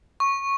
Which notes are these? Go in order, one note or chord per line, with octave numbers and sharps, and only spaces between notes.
C#6